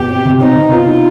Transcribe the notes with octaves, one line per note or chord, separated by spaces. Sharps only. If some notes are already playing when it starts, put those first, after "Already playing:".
Already playing: B2 G4
C4
C3
C4 D#4
C3
B3 F4
D#4